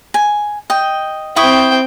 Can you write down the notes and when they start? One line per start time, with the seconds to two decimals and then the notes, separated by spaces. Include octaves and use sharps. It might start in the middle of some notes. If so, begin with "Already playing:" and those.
0.14 G#5
0.70 D#5 G5
1.36 C4 E4 G5 C#6 D#6